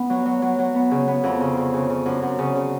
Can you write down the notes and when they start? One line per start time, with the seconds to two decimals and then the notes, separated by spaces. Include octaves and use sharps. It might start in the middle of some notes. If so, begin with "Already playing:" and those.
Already playing: B3
0.10 F#3
0.26 F#3
0.42 F#3
0.59 F#3
0.75 B3
0.91 C#3
1.08 B3
1.24 F2
1.41 C#3
1.57 C#3
1.74 C#3
1.90 C#3
2.06 F#2
2.22 F#2
2.39 C#3
2.55 C#3